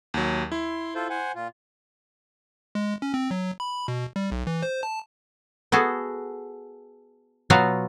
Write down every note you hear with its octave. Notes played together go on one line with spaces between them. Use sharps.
D#2 F#3
E4 C6
F4 A4 C5
C5 F#5 G#5
A#2 F4
G#3
C#4
C4
F#3
B5
B2
G3
B1
E3
C5
A5
B3 F#4 G#4 A4
B2 F#3 B3 F4 F#4 F5